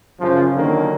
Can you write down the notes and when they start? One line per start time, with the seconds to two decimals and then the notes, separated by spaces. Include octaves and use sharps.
0.20 F#2 C#3 F3
0.54 D3 D#3 F#3 A#3